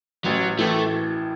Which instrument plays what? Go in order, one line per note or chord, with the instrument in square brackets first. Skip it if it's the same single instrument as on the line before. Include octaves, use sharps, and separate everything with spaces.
[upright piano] A1 [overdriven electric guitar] F#3
[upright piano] A2 E3 [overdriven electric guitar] A3